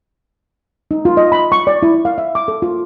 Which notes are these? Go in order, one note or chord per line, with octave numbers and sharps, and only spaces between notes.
D#4
F4
D#5
B5
C#6
D5
E4
F5
E5
D6
A4
F4